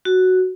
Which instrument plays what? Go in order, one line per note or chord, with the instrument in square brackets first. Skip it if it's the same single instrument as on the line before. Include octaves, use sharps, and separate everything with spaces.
[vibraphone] F#4